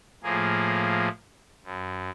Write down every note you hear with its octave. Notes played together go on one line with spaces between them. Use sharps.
A2 F3 A#3 G#4
F#2